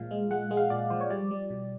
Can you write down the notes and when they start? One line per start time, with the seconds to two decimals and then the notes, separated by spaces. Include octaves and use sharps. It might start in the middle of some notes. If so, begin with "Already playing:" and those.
Already playing: A#2 F3 G#3 F5
0.11 G#3
0.31 G#3 F#5
0.51 G#3
0.57 F5
0.70 A#2 D5
0.90 F3 C5
1.01 C#5
1.10 G3 D5
1.31 G3
1.50 B2